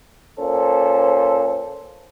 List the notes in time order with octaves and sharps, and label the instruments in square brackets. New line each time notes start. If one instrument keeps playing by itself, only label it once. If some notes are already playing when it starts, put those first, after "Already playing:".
[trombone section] A#2 C#4 A4 C5